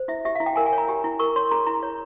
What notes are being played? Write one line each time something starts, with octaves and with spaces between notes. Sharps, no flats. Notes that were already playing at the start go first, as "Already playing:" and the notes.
Already playing: C5
E4 E5
G4 E5
F5
E4
G5
A#4 G#5
G#5
C#5
A#5
G4
E4
A#4 C#6
C#5 C6
G#4 A#5
E4 A#5
C#5